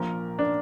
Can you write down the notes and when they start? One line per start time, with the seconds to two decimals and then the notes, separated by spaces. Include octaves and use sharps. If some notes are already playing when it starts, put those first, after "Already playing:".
Already playing: A#1 A#2 F3 A#4
0.39 D4